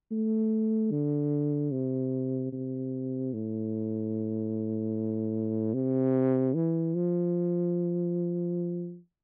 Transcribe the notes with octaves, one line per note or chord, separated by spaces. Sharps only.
A3
D3
C3
C3
A2
C3
E3
F3